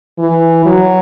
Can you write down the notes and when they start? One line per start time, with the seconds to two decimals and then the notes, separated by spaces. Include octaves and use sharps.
0.19 E3
0.66 F#3